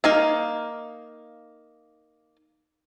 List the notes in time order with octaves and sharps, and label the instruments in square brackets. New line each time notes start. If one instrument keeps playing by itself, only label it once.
[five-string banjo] A#3 D#4 F5